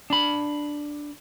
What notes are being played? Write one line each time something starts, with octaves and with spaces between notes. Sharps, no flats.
D4 B5